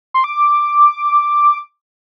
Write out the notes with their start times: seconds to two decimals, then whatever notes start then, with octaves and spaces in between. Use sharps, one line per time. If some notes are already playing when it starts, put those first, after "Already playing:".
0.14 C6
0.24 D6